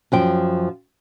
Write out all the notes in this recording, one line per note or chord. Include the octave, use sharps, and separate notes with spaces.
F#2 F3 G5